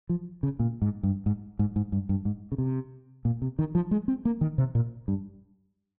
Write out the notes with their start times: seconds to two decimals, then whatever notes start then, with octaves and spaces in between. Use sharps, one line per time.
0.09 F3
0.43 C#3
0.59 A#2
0.82 G#2
1.03 G2
1.26 G#2
1.59 G#2
1.76 G#2
1.92 G2
2.09 G2
2.25 G#2
2.52 C#3
2.58 C3
3.25 A#2
3.42 C3
3.59 D#3
3.75 F3
3.91 G#3
4.08 C4
4.25 A#3
4.41 D#3
4.58 C3
4.75 A#2
5.08 G2